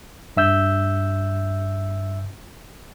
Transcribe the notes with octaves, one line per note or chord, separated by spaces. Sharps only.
G2 E5 E6 G6